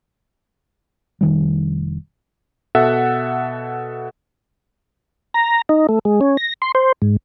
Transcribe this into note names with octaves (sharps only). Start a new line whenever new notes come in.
F1 D#3 G3
B2 A4 E5 F#5
A#5
D#4
A3
G#3
C#4
A#6
C6
C5
G#2